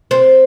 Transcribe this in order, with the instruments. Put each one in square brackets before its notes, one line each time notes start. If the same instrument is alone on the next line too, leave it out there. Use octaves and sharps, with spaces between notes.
[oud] C4